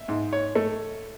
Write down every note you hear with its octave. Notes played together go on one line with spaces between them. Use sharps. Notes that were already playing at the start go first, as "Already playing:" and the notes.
Already playing: E5
G#2
C#5
A3